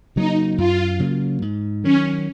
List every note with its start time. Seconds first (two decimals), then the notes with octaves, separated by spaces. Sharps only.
0.16 C#3 F#3 A#3 D#4
0.58 F#2 F4
0.99 C#3 F#3 A#3
1.42 G#2
1.83 D#3 F#3 C#4